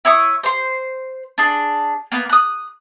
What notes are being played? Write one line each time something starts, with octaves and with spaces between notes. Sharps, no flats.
E4 C#5 C#6 D#6
C5 C6
D4 G#4
A#3 B3
D#6 F#6